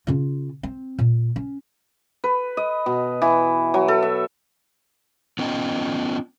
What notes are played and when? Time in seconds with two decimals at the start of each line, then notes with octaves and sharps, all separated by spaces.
0.07 C#3 F4
0.63 C4
0.99 A#2
1.36 C#4
2.24 B4
2.57 D#5
2.86 B2
3.22 E3
3.74 F#3
3.88 A4
4.02 E5
5.39 B3 C#4 F4 D#5 G5